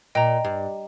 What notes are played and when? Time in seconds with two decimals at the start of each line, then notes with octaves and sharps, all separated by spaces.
0.15 A#2 D#5 G5 A#5
0.45 G2